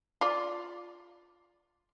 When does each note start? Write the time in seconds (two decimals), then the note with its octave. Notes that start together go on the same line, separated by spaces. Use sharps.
0.21 F4 D5